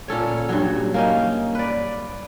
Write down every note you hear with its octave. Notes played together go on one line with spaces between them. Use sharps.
A#2 C#4 A4 C#5
G2 F#3
A#3 C#4 D#4
B4 D5